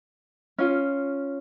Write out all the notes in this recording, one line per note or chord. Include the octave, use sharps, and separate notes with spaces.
C#4 F4